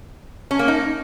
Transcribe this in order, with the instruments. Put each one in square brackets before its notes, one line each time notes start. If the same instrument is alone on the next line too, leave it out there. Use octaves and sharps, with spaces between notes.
[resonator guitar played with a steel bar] C#4
A#3
D#4